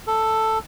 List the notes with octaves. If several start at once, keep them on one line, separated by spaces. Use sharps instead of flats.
A4